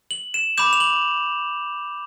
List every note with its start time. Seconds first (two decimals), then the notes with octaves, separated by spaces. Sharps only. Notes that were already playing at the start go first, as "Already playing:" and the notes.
0.11 F#7
0.34 E7
0.58 B5 D6 G6 E7
0.73 F7
0.80 F#7